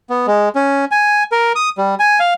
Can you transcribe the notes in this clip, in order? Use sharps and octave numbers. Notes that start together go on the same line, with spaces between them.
B3
G#3
C#4
G#5
A#4
D#6
G3
G#5
F5